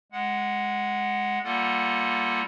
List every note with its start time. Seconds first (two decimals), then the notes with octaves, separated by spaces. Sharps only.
0.12 G#3 F#5
1.44 G3 A#3 F4 A4 F#5